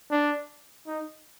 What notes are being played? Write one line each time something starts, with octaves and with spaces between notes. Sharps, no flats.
D4
D#4